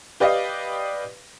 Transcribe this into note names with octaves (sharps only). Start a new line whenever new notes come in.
G4 B4 D5 D#5 F5